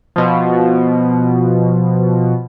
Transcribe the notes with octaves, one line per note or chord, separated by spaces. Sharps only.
B2 F3